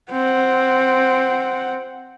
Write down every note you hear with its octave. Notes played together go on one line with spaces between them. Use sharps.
C4 F#5